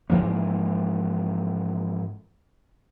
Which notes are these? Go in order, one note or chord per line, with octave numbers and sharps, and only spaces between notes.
G#2 E3 F3 A#3